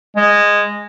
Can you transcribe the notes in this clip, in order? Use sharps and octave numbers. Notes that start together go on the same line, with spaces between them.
G#3